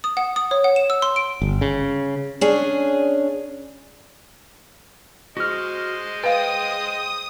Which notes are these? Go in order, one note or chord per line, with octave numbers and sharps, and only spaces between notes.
D#6
F#5
D#6
C#5
F#5
E7
E6
C6
D7
G1
C#3
C#4 D4 G#4
G#3 F#4 C5 D#5 F6
B4 F5 G5 D#6